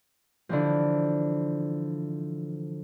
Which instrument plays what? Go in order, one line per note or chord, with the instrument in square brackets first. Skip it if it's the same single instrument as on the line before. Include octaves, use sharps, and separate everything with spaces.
[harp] D3 E3 F3